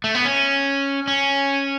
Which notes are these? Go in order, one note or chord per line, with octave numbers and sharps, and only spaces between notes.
A3
B3
C#4
C#4